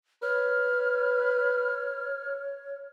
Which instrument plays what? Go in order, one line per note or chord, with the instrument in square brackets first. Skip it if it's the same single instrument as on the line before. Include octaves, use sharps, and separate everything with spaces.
[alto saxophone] B4 [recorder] C#5 [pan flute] F6